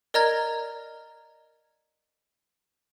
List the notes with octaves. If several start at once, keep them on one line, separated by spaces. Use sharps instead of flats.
A#4 D5 D#5 A#5 F6 G#6